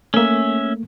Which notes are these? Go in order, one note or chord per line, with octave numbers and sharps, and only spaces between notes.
A3 A#3 C#4 E5